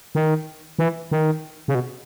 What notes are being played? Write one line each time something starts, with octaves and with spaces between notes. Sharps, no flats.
D#3
E3
D#3
C#3
B2